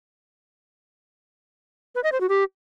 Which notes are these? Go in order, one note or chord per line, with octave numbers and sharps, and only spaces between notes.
B4
D#5
C5
F#4
G4